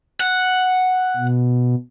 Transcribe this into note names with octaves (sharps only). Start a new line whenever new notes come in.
F#5
B2